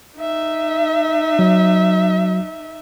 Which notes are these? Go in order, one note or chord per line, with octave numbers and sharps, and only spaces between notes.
D#4 E5
F#3